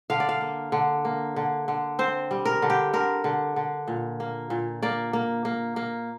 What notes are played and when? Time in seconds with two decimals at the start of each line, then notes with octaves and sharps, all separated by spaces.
0.10 D3 F5
0.20 D5
0.29 F5
0.41 A#3
0.72 D3
1.05 A#3
1.36 D3
1.68 D3
1.99 C4 C5
2.31 G3
2.45 A#4
2.62 D3
2.70 G4
2.93 D3 A#4
3.24 D3
3.56 D3
3.88 A#2
4.20 A#3
4.50 A#2
4.83 A#3 D5
5.13 A#3
5.45 A#3
5.76 A#3